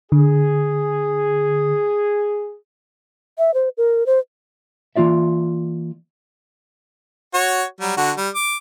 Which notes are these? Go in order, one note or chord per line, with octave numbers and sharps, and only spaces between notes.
D3 G#4
E5
C5
A#4
C5
E3 A#3 F4 D5 E5
F#4 C#5
F#3 G3
D3 F#4
G3
D6